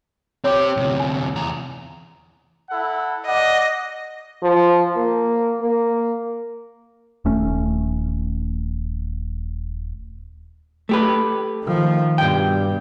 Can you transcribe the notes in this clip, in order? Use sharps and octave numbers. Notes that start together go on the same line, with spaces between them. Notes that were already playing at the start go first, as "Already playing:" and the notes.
C4 G4 C#5 C6 D6
D2 C3
G#5
E2 A#5
E4 A4 F#5
D5 D#5 F#5
F3
A#3
A#3
D#1 A3 C#4
A3 G4 B4
D#3 F3
G2 B2 G5